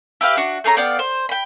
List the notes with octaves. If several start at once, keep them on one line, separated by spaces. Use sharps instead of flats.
E4 G4 B4 F5
D4 F#4
A3 G#4 C#5 A#5
B3 D5 F5 G5
C5
G5 B5